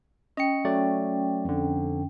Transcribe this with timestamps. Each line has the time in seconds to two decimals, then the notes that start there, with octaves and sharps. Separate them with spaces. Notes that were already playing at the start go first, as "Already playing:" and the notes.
0.37 C#4 D#5 G5 C#7
0.65 F#3 A3 D5
1.45 F2 D3